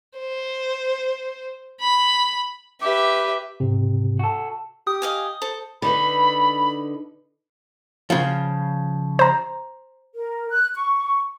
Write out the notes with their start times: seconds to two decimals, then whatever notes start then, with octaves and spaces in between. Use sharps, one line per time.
0.19 C5
1.81 B5
2.81 G4 B4 E5 D6
3.60 G#2 C3
4.19 F#4 A4
4.87 G4 D#6
5.02 D#5 F5 G#5
5.42 A4 C5
5.82 D3 D#4 B4 B5
8.10 C#3 F3
9.19 C5 A#5
10.15 A#4
10.51 F#6
10.75 C#6